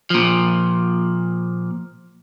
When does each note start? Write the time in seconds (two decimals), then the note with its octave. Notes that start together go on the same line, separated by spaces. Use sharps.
0.10 A#2 F3